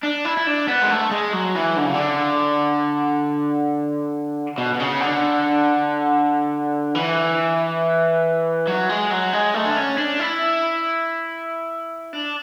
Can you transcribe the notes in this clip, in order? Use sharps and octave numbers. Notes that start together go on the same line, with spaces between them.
D4
E4
E4
D4
B3
G#3
A3
G#3
F#3
E3
D3
C#3
D3
B2
B2
C#3
D3
E3
F#3
G#3
F#3
G#3
A3
D4
C#4
D4
E4
D4